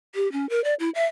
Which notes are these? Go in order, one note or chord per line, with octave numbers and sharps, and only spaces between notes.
G4
C#4
A#4
D5
E4
E5